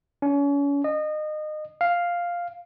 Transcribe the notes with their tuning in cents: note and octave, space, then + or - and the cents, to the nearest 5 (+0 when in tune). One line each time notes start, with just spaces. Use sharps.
C#4 +35
D#5 -25
F5 +0